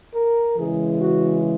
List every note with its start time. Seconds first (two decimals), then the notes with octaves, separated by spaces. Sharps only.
0.14 A#4
0.57 C#3 E3 G#3 G#4
1.00 F#4